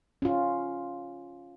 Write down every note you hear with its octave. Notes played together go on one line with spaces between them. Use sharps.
C#4 F4